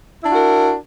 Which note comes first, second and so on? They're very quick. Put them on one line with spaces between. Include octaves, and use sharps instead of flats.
E4 D4 F#4 A#4